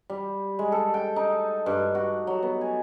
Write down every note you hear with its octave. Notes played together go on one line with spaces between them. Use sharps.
G3
G#3
A4
G5
D#4
G2
F#4
F#3
B3
G#5